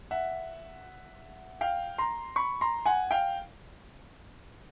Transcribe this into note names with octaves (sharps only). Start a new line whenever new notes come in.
E5 F#5
F5 G5
A#5 C6
B5 C#6
A#5 C6
F#5 G#5
F5 G5